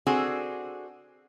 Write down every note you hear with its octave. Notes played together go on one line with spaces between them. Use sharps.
C4 D4 F#4 G#4 A4